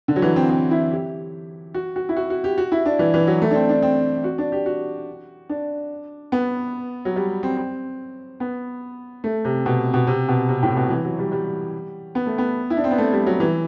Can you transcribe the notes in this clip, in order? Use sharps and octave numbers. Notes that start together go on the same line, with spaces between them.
D3
F#3
E3
C4
C4
E4
G4
F#4
F#4
E4
F#4
F#4
G4
F#4
E4
D4
E3
E3
F#3
A3
D4
C4
D4
C4
F#4
D4
G4
F#4
D4
B3
F#3
G3
C4
C4
B3
A3
C3
B2
B2
C3
B2
C3
A2
B2
E3
F#3
G3
G3
B3
A3
B3
E4
D4
C4
B3
A3
G3
F#3
E3